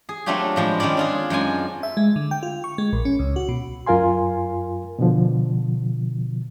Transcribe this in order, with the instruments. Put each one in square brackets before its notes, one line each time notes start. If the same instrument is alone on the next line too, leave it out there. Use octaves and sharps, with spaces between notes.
[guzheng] G#4
F#3 A3 C4 D4 F4 G4
A2 F3 G#3
D#3 G#3 C4 C#4 D5
D4 F4 G#4
F#2 G#3 F4 G#5
[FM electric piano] E5
G#3
D3
G5
F4
C#6
G#3
A#1
C#4
C#2
F#4
B2
[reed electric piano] F#2 F4 A#4 F5 G#5 C6
B2 D3 F3